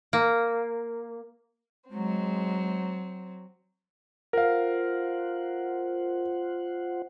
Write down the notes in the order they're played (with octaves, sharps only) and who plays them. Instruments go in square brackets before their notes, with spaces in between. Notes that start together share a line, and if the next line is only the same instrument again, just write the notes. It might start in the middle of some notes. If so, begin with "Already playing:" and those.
[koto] A#3
[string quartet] F#3 C4 [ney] G#3
[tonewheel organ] F4 C5 F#5 [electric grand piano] A#4 F5